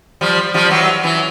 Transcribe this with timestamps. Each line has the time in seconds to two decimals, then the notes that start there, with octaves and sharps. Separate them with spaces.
0.21 F3 G3
0.54 F3 G3
0.71 E3 F#3
1.04 E3 F#3